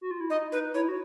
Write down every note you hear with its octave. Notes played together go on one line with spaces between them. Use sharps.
F#4
F4
E4
D#4 D#5
D#4 B4
E4 C#5
F#4